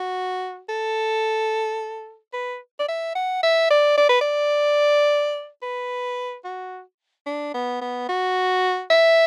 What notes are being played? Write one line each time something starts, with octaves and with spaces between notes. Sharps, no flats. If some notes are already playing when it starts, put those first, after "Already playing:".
Already playing: F#4
A4
B4
D5
E5
F#5
E5
D5
D5
B4
D5
B4
F#4
D4
B3
B3
F#4
E5